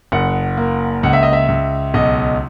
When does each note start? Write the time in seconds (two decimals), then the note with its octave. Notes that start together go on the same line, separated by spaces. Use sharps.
0.12 F#1 F#5
0.57 A#3
1.03 C#2 F#5
1.13 E5
1.23 D#5
1.33 E5
1.48 C#2
1.94 B1 D#5